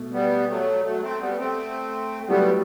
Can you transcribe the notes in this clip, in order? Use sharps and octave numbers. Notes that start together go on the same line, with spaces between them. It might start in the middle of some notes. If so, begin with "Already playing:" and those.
Already playing: B2 A3
G3 B3
F#3 A3
F#3 A3
A3 C4
G3 B3
A3 C4
F#3 G3 A3 B3 E4 G4